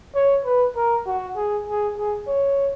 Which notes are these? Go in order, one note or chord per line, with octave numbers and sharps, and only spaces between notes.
C#5
B4
A#4
F#4
G#4
G#4
G#4
C#5